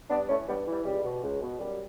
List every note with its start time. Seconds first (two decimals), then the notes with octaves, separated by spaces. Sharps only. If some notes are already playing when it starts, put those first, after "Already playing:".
0.10 G2 B3 D4
0.29 E3 A3 C#4
0.48 G2 G3 B3
0.67 E3
0.72 G3
0.85 C#2 G3
1.04 B2
1.23 C#2
1.42 B2
1.59 F#2 G3